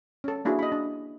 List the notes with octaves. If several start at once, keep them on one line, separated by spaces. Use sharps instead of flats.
C#4 A4
A#3 D4 E4 F#4 G#4
D#5 B5
D4